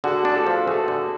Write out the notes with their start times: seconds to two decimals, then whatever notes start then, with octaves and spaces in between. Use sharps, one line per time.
0.04 D3 F#4 G#4
0.25 D4
0.35 G4 A4
0.47 F3
0.67 A3 F#4 G#4
0.88 D3